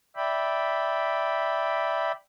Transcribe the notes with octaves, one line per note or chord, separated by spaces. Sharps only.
D5 E5 G5 B5